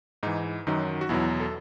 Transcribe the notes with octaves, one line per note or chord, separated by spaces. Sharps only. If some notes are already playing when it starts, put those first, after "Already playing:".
G#2 E3 D#4
F#2 D#3 F#3 D#4
F#4
E2 B2 F#3 E4
A4